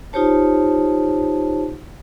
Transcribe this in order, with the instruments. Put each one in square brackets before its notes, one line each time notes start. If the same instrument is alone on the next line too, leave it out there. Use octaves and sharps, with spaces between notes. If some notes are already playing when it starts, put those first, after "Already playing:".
[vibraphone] D#4 F4 G4 C5 C#5 A5